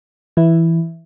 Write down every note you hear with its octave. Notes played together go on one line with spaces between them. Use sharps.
E3 E4